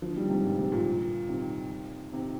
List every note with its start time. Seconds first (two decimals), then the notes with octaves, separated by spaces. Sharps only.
0.02 D3 F3
0.16 D#3 G3
0.30 G#2 C3
0.44 G2 A#2
0.58 G#2 C3
0.72 A#2 D3
1.29 C3 D#3
2.13 C3 D#3